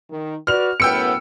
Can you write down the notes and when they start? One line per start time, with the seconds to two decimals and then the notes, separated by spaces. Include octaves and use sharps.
0.11 D#3
0.47 F#4 B4 D5 F6 F7
0.80 F#2 A2 B3 G5 E6 C#7